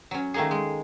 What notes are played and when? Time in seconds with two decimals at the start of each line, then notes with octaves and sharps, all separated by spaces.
0.11 F#3 C#4
0.34 D#3 A3 A#3 D#4 G#4
0.51 G#3